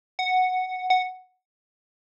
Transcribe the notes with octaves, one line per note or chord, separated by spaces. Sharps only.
F#5
F#5